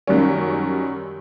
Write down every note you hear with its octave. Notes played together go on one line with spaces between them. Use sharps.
F#2 D#3 G3 C#4